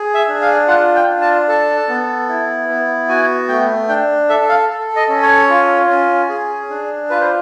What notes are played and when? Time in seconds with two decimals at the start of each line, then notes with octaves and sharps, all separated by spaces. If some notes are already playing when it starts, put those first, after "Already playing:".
Already playing: G#4
0.15 E5
0.28 D4
0.41 F5
0.68 F4 F#5
0.95 G5
1.08 D4
1.21 A5
1.48 A4 A5
1.88 B3
2.29 E4
2.69 B3
3.09 F#4 G#5
3.49 A3 G5
3.88 D4 G5
4.29 A4 E5
4.49 F5
4.70 A4
4.96 D#5
5.09 C#4
5.22 C#5
5.49 F4
5.90 C#4
6.29 G#4
6.70 D4
7.10 F4 B4
7.21 C5